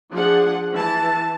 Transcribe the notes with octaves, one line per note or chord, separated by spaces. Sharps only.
F3 D4 G#4 F#5
E3 A5